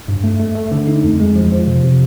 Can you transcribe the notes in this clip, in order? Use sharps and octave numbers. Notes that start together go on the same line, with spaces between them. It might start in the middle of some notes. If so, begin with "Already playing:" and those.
G2
A3
A3
A3
D3
D#4
F2
G#3
F3
F3
C3
C3